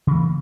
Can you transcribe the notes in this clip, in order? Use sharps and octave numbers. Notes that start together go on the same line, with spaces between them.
C#3 E3 A#3